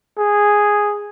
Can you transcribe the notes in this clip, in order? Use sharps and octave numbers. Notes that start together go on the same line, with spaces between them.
G#4